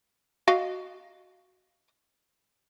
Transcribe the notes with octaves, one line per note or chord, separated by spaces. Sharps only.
F#4 D#5 F5